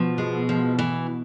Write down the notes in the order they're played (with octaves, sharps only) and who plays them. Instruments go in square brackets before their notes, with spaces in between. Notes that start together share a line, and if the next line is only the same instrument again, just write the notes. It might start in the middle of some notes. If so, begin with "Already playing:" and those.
Already playing: [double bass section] B2 [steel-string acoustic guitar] F3
[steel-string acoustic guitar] G#3
F3
E3